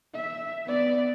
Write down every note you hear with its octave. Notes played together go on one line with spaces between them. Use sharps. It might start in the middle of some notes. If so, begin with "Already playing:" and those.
E5
B3 D5